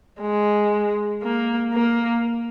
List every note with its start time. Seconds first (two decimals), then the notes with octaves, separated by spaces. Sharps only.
0.21 G#3
1.22 A#3
1.73 A#3